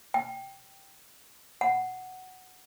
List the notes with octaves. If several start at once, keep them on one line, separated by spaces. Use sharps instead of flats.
G5
F#5